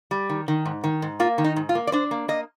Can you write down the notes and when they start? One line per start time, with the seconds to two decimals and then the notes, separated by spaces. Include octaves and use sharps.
0.11 G3
0.29 D#3
0.48 D#3
0.66 G#2
0.84 D#3
1.02 G#2
1.20 A#3 F4
1.38 D#3
1.44 D#4
1.56 G#2
1.69 F4
1.75 A#3
1.87 D5
1.92 D4 C5
2.11 A#3
2.28 A#3 D#5